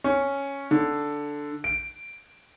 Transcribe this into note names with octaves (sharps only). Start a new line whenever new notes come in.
C#4
D3
D7